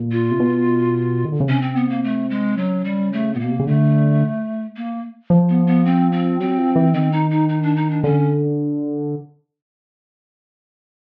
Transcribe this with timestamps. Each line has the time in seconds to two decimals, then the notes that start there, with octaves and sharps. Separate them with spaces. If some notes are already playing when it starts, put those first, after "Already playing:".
Already playing: A#2
0.12 F4
0.31 C3
0.40 B2
1.25 D#3
1.32 D3
1.40 C#3
1.48 C3 C#4
1.62 C4
1.76 B3
1.90 A#3
2.04 A3
2.30 G#3
2.58 C#3 F#3
2.85 G3
3.13 A3
3.34 A#2 B3
3.40 B2 A#3
3.51 C3
3.60 C#3
3.66 D3 A3
4.76 A#3
5.30 F3
5.49 B3
5.67 B3
5.86 C4
6.12 C4
6.40 F#3 C4
6.58 F3
6.76 E3
6.94 D#3 C4
7.12 D#4
7.31 D#4
7.49 D#4
7.62 D4
7.76 D#4
7.90 D4
8.03 D3 C#4